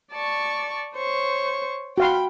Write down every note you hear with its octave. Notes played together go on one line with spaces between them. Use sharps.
D5 A5 C#6
C5 C#5 C#6
F#4 F5 G5 B5 C6